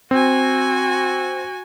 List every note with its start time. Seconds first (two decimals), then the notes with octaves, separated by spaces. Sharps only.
0.11 C4 F#4 G#5